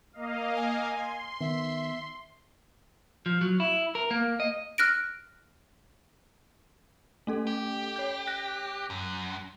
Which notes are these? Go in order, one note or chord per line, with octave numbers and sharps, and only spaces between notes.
A#3 D#5 F5
G#5
C6
D#3 B3 E5
F3
F#3
E4
A#4
A#3
D#5
F6 F#6 A#6 D7
A3 C#4 A4
G4
C#5 G6
F#6 A#6
F#2